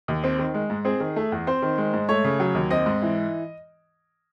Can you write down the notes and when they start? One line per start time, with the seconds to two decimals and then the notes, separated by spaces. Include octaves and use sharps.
0.08 D#2
0.24 C4
0.39 D#3
0.54 G#3
0.70 G#2
0.85 C4 G#4
1.00 D#3
1.16 A3
1.32 E2
1.47 C4 C5
1.62 D#3
1.78 G#3
1.93 G#2
2.09 A3 C#5
2.24 C#3
2.40 F#3
2.55 D#2
2.70 C4 D#5
2.86 G#2
3.02 E3